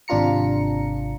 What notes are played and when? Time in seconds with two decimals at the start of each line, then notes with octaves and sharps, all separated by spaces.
0.08 G#1 C3 D4 F4 A#5 C#7